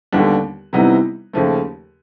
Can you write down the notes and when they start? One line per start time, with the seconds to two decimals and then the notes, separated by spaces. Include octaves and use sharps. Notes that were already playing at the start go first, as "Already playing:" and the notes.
0.12 D#2 D3 G3 B3 D4
0.73 C3 E3 G3 B3 D#4
1.33 D#2 C#3 F3 A3